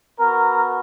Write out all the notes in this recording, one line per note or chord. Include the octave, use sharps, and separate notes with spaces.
B3 F#4 A#4